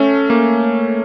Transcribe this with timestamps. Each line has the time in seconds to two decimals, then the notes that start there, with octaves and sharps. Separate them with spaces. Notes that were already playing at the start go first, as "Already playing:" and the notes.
Already playing: A3 C#4
0.30 A#3